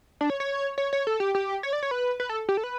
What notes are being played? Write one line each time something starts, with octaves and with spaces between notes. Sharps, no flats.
D4
C#5
C#5
C#5
C#5
A4
G4
G4
C#5
D5
C#5
B4
B4
A4
G4
A4
B4